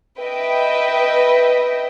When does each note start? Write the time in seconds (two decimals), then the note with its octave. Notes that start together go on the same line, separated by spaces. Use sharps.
0.21 B4 D#5 E5 G5